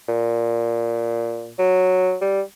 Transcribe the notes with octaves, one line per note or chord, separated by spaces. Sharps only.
A#2
F#3
G3